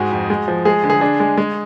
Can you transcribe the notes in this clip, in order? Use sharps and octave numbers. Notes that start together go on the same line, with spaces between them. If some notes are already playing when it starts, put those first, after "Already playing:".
Already playing: G#2 G#3 F#4
F2
G#3
F3
G#3 G#4
D3
G#4
D4 G#4
G#3
G#3